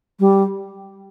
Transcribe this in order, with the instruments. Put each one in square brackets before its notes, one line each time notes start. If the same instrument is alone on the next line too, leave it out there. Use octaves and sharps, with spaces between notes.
[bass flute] G3